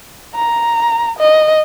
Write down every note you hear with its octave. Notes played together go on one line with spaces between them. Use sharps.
A#5
D#5